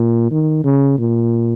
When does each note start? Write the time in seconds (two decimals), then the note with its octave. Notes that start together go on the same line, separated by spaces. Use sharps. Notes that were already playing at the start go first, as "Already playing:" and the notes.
Already playing: A#2
0.31 D#3
0.64 C#3
0.98 A#2